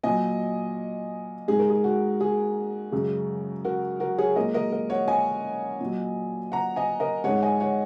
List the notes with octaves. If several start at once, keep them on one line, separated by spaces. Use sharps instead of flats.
A#2 F#3 D#5 G#5
G#2 G#3 G#4
A#4
G#4
F#4
G#4
F#2 C#3 G#3
F#4 A#4
F#4 A#4
G#4 C#5
A#2 G#3 A#4 D#5
A#4 D#5
A#4 D#5
C#5 F#5
D#5 G#5
A#2 F#3
F#5 A#5
D#5 G#5
A#4 D#5
G#2 G#3 C#5 F#5
D#5 G#5
C#5 F#5